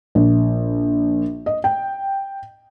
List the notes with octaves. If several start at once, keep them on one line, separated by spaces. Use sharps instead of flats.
A#1
D#5
G5